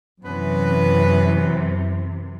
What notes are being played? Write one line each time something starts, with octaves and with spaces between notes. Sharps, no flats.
F#2 C3 E3 B3 C#4 B4